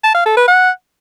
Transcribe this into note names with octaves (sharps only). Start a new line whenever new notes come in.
A5
F5
A4
B4
F#5